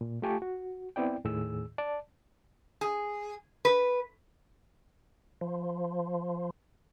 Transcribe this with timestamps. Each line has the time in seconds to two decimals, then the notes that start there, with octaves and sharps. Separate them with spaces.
0.01 A#2
0.22 A3 F4 G4 G#5 A5 C#6
0.42 F#4
0.96 B3 C4 E4 D5 G5
1.24 D#2 A2 D#3 G#4 E6
1.78 D5 A5
2.81 G#4
3.65 B4
5.41 F3